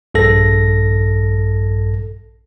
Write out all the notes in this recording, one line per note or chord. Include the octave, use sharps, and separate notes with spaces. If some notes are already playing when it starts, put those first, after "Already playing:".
A#1 G2 A4 A#6